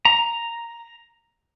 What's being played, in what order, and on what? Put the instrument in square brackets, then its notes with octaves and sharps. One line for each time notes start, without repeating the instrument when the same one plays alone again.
[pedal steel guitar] A#5